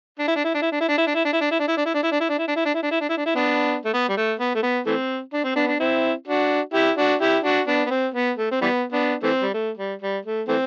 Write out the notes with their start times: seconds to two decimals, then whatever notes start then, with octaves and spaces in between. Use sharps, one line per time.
0.19 D4
0.28 E4
0.36 D4
0.44 E4
0.54 D4
0.62 E4
0.72 D4
0.80 E4
0.89 D4
0.98 E4
1.07 D4
1.15 E4
1.25 D4
1.33 E4
1.41 D4
1.51 E4
1.59 D4
1.68 E4
1.78 D4
1.86 E4
1.94 D4
2.03 E4
2.12 D4
2.20 E4
2.29 D4
2.38 E4
2.48 D4
2.56 E4
2.65 D4
2.74 E4
2.83 D4
2.91 E4
3.01 D4
3.10 E4
3.17 D4
3.26 E4
3.35 B3 D4
3.85 A3
3.93 B3
4.09 G3
4.17 A3
4.39 B3
4.55 A3
4.63 B3
4.86 E3 A3 C4
5.33 D4
5.44 C4
5.55 B3 D4
5.68 D4
5.80 C4 E4
6.28 D4 F#4
6.74 E4 G4
6.97 D4 F#4
7.21 E4 G4
7.43 D4 F#4
7.67 B3 D4
7.86 B3
7.91 C4
8.14 B3
8.38 A3
8.51 C4
8.61 E3 G3 B3
8.92 B3 D4
9.23 E3 A3 C4
9.42 G3
9.54 A3
9.77 G3
10.02 G3
10.25 A3
10.48 E3 A3 C4